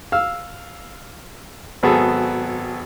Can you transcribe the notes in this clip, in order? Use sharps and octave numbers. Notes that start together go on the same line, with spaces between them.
F5 E6 F6
G#1 F#3 B3 C4 G#4 A4